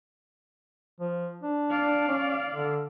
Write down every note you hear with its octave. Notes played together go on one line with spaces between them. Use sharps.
F3
D4
D5 F5
C#4
D3